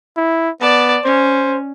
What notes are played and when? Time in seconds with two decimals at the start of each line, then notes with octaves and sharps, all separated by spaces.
0.17 E4
0.61 B3 D5 A5
1.05 C#4 C5